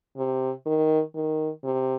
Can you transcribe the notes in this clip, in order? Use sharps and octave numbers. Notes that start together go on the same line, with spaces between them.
C3
D#3
D#3
C3